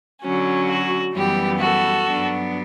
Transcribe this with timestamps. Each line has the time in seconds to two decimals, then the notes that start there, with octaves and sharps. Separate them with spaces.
0.21 D3 F#3 C#4
0.67 F#4
1.14 F#2 E3 G3 B3 G4
1.60 F#4 A4
2.06 G2 F#3 B3 D4